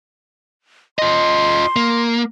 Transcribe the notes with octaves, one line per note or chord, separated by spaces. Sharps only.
F4 D#5 C6
A#3